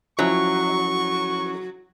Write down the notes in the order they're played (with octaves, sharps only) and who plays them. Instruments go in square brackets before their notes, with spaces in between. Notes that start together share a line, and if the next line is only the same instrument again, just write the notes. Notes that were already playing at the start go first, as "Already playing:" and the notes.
[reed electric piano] F3 C#4 E4 [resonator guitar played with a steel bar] F#3 [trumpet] C#6